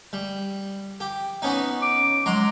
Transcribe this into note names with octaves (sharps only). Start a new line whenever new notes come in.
G3
G4
B3 C#4 D#4
D6
F#3 G#3 A#5 C6